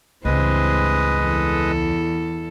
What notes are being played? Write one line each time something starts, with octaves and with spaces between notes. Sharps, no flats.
C#2 G2 E3 G#3 C4 B4 D#5
E2 A4